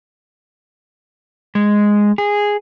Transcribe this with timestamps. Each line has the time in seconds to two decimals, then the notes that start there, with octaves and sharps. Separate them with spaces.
1.55 G#3
2.18 G#4